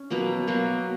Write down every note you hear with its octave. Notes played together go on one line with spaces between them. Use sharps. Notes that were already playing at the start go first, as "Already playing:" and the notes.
Already playing: C#4
B2 F#3 A#3 B3
B2 F#3 A#3